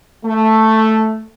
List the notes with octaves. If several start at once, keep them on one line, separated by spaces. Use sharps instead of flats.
A3